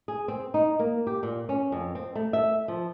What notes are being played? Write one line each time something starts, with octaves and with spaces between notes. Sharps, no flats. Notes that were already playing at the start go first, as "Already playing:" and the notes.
G#4
C4
D#4
A#3
G4
A#2
C#4
F2
C4
A3
E5
F3